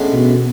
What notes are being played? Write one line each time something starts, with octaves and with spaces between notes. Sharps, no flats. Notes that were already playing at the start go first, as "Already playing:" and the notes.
Already playing: A1 A2 G#3 B3 D4
B2